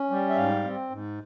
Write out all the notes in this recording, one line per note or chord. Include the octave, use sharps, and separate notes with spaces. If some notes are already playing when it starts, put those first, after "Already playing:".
Already playing: C#4
G3
E5
G#2 F5
C4
G#2